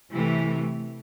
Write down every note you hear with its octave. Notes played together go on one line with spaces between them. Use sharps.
C3 E3 A3